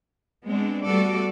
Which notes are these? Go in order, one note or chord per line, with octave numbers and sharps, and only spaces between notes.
G#3 B3 C4 D4
G3 A3 B3 F#4 A4 D5